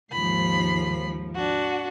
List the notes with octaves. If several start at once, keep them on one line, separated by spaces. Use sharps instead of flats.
D#2 G#2 F3 B5 C7
D4 F#4